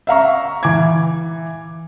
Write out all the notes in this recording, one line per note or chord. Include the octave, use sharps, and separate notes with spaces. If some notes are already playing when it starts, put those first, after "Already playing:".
E5 F5 A#5 C#6
E3 D6 G#6